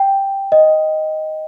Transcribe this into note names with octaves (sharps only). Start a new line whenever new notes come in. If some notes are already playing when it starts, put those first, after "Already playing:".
Already playing: G5
D#5